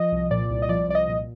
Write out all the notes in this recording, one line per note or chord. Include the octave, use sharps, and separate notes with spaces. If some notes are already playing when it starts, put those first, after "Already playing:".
Already playing: F3 D#5
C2
A#2 D5
C2
D#5
F3 D5
C2 D5
D#5
A#2